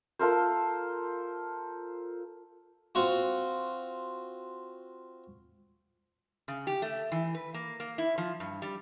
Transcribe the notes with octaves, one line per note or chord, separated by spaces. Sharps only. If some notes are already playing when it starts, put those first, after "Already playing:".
F4 A4 A#4 C5
C4 F4 F#4
C#3
G4
A3
E3
B4
A#3
A#3
E4
F3
G2
G3